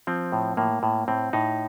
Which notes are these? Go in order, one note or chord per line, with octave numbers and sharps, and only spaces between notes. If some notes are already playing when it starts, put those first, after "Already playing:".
F3 C4
A2
A2 A#3
A2
A2 C4
A2 D#4